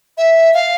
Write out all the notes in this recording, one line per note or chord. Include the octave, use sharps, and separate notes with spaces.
E5
F5